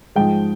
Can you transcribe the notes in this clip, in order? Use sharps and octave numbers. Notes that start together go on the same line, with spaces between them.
G#2 F3 G#3 G5